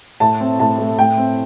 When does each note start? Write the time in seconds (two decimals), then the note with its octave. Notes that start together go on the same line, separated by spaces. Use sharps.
0.20 A2 A5
0.40 C4
0.60 A2 A5
0.79 A3
0.98 A2 G5
1.17 C4